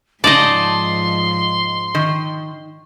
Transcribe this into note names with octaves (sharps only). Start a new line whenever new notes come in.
G#2 C#3 F3 D#4 D5 D#5 A5 C6
D#3